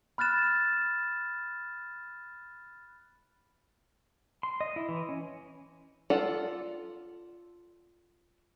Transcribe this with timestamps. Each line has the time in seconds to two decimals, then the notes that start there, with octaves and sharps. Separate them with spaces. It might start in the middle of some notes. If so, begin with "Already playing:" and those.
0.18 B5 F6 F#6 A6 E7
4.43 C6
4.61 D#5
4.76 E4
4.89 E3
5.09 C#4
6.10 F4 A4 D5 F#5